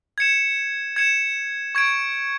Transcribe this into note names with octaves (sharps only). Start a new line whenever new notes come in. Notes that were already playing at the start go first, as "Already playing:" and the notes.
G#6 C#7 E7
G#6 C#7 E7
C#6 G#6 D7